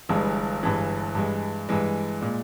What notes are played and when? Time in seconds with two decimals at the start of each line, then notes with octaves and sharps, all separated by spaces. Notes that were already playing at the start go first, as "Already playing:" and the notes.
0.09 G1 G2 E3 G#3
0.62 G1 G2 E3 G#3
1.15 G2 E3 G#3
1.69 G2 E3 G#3
2.21 A#2 G#3